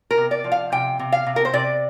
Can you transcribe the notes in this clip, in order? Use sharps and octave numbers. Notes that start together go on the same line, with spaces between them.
A#4
C3
D5
F3
F5
C3 G5
C3
F5
C3
A#4
C5
C3 D5